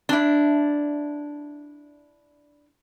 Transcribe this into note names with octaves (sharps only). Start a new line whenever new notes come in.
D4 E4